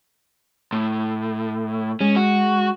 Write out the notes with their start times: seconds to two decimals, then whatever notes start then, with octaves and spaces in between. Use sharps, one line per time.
0.73 A2
2.01 G#3 C#4
2.16 F#4